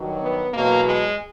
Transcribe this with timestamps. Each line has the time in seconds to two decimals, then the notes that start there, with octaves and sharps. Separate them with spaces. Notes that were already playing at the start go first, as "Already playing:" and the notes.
Already playing: G2 D#3 F#3
0.22 B3
0.53 E2 B2 F#3 A#3
0.85 G#3